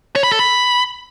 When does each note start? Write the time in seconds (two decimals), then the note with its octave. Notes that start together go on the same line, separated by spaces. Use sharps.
0.16 C#5
0.23 B5
0.31 A4
0.39 B5